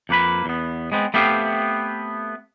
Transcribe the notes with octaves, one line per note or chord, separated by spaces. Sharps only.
F2 A#3 B4 B5
E2 B3
G#3 B3 C4
A3 B3 C4 G4 F5